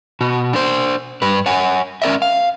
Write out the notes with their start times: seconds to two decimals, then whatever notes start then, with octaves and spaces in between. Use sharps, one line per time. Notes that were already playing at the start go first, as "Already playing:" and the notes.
0.21 B2 F#4
0.53 D4 C5
1.22 G2 B4
1.46 C#5 F#5 G#5
2.02 C#4 A#4 D5 E5
2.22 F5